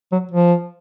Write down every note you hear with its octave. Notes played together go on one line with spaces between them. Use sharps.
F#3
F3